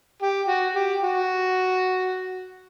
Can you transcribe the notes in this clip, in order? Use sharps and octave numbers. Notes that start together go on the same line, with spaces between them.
G4
F#4
G4
F#4